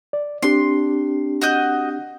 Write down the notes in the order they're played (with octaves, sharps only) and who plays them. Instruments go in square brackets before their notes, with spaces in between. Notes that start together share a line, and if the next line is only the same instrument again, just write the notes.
[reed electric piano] D5
[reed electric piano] C4 D4 G4 [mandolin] C6
[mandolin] F#4 D#5 G6